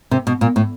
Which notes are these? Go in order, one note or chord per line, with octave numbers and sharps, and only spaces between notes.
C3
B2
A#2
A2